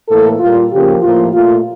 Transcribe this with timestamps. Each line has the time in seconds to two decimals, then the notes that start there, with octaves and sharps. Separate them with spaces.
0.09 A2 E3 A#3 A4
0.40 A#2 G3 A#3 F4
0.72 C#3 F3 A#3 G4
1.03 A2 F3 A#3 F4
1.34 A#2 A3 F4